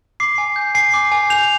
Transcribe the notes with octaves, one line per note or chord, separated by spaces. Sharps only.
D6 C7
G#5
G6
G#5 C7
D6
G#5
G6 F7